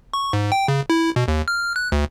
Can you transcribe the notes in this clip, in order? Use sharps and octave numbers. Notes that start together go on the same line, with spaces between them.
C#6
G#2
G5
C#3
E4
B2
D#2
F6
F#6
D2